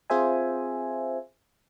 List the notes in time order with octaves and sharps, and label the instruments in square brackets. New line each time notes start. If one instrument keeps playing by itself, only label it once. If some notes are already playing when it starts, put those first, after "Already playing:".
[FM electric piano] C4 F4 G#4 C5 E5 G#5